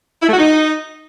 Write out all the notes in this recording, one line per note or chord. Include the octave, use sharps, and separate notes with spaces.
E4
A3
F#4
D#4